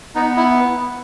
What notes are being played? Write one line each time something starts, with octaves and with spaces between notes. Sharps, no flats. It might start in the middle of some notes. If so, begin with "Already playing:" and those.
B3 D#4
E4